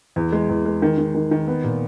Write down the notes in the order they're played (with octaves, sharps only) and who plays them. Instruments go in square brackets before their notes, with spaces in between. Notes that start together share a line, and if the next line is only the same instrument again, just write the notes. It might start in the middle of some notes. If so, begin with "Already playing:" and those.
[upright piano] E2
G#3
E2
G#3
D#3
D#3
D#3
D#3
B3
A#2